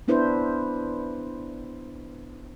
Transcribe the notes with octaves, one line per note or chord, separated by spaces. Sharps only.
B3 D4 E4 B4 C5